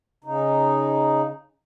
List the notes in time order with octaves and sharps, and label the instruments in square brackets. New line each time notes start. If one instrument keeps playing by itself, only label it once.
[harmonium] C#3 D#4